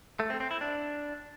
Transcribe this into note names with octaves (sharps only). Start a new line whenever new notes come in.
A3
C4
C4
E4
D4